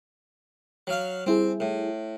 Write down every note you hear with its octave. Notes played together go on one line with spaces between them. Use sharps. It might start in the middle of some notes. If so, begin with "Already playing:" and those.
F#3 F5
G3 C4 E4 G#4
A2